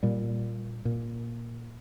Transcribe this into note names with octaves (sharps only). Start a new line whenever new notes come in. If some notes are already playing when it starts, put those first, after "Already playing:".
A#2 G3
A#2